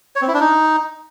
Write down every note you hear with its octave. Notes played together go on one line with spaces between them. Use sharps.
C#5
C4
E4
D4
D#4